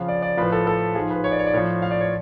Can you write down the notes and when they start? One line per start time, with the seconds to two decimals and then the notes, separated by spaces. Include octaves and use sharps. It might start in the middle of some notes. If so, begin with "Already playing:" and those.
Already playing: F2 C#3 F3 F5
0.08 D5
0.22 D5
0.37 A2 F3 B4
0.52 A4
0.67 A4
0.95 G#2 F3 G#4
1.10 B4
1.24 C#5
1.31 D5
1.39 C#5
1.46 D5
1.54 A2 F3 C#5
1.82 F5
1.91 D5
2.01 C#5